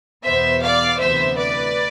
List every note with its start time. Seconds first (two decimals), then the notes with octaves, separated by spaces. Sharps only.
0.24 E2 B2 B3 C5 E5
0.62 D5 F5
1.00 D2 C3 E3 B3 C5 E5
1.37 B4 D5